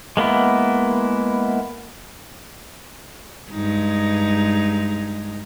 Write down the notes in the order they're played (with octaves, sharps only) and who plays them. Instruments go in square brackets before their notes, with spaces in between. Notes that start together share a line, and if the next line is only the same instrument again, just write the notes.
[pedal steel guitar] G#3 A#3 B3 E4
[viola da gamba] G2 G#3 D#4